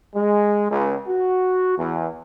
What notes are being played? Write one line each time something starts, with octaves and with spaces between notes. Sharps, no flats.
G#3
C#2
F#4
E2